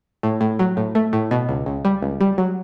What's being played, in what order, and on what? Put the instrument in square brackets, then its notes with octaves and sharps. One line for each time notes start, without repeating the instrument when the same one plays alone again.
[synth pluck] A2
A2
F#3
A2
A3
A2
B2
C#2
C#2
G3
C#2
G3
F#3